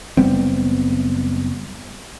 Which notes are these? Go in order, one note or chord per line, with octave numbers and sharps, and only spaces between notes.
F#1 G3 B3 C4